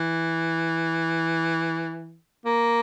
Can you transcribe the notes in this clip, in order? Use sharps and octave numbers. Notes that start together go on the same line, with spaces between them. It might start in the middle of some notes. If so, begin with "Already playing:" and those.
Already playing: E3
A#3